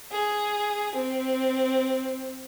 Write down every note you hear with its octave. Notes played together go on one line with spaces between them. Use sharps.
G#4
C4